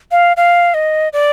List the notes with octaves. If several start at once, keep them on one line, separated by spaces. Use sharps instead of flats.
F5
F5
D#5
D5